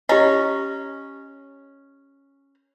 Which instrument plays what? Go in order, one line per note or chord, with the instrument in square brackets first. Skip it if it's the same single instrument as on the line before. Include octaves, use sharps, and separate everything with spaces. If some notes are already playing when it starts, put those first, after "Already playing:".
[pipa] C#4 A#5 [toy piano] G4 D#5